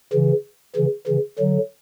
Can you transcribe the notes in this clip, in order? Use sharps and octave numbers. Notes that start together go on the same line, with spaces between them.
C#3 E3
C#3 E3
C#3 E3
D3 F#3